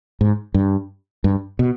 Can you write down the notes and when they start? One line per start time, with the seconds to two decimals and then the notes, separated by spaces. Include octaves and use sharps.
0.21 G#2
0.54 G2
1.24 G2
1.59 B2